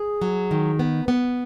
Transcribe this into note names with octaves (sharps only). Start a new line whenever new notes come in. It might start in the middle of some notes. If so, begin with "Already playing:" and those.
Already playing: G#4
F#3
D#3
B3
B3